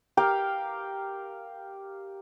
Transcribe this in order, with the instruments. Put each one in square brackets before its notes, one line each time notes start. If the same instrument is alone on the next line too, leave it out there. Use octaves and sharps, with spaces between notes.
[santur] G4 A#4 F5 G5